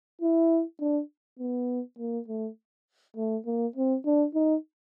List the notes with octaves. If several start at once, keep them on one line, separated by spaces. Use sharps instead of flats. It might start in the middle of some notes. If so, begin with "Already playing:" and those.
E4
D4
B3
A#3
A3
A3
A#3
C4
D4
D#4